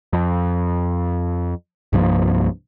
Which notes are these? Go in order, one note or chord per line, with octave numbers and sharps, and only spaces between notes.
F2
C2 G2 F3 A#3